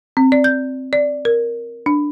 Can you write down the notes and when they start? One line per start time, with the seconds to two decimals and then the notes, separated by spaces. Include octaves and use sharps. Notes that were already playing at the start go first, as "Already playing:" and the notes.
0.17 C4
0.32 D5
0.44 G6
0.93 D5
1.25 A#4
1.86 D4